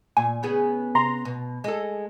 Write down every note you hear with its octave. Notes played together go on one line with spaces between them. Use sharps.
A#2 G#5
C#3 B3 G#4
C3 A#5 C6
B2
G#3 A4